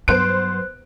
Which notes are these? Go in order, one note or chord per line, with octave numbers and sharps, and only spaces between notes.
G2 F#3 B3 C5 F#6 D7